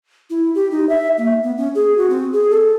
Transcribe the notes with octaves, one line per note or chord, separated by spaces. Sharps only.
E4
G4
D#4
E5
A#3
B3
C#4
G#4
F#4
C4
G#4
A4